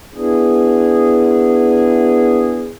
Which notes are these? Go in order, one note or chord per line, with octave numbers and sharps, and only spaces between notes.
B3 D4 E4 G#4